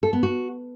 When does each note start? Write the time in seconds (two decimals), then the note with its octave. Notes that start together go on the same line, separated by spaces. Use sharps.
0.03 A4
0.13 B3
0.23 F#4